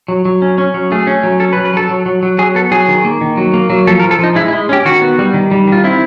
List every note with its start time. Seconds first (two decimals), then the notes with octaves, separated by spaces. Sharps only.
0.08 F#3
0.25 F#3
0.42 C#4
0.58 C#4
0.74 F#3
0.92 A3 G#4
1.07 C#4
1.23 F#3
1.40 C#4 A4
1.53 B4
1.57 F#3
1.65 B4
1.74 F#3 A4
1.89 F#3
2.06 F#3
2.23 F#3
2.38 F#3 G#4
2.55 B3 A4
2.71 F#3 G#4
2.88 D#3
3.05 A#3
3.21 D#3
3.37 F#3
3.54 A#3
3.70 F#3
3.87 F3 A4
4.00 A#4
4.04 F3
4.11 A4
4.19 F3 D#4
4.35 G#3 E4
4.48 E4
4.53 G#3
4.69 C#4 G4
4.85 D#3 F#4
5.02 B3
5.19 G3
5.34 D#3
5.51 G3
5.67 D#3 F4
5.84 C4 E4